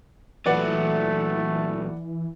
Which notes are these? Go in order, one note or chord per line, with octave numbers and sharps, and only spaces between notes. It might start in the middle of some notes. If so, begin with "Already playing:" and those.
A#2 E3 F#3 A3 B4 D5 F#5